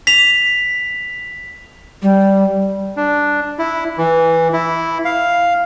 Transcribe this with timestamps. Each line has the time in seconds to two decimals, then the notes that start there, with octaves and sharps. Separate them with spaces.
0.07 B6 F7
2.02 G3
2.97 D4
3.59 E4
3.98 E3
4.53 E4
5.05 F5